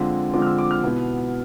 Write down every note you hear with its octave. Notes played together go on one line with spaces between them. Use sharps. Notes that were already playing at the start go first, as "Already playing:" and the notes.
Already playing: D3 F3 G#3 C4 F4
D3 F3 G#3 C4 F4 D6
F6
E6
D6
F6
B2 B3 E4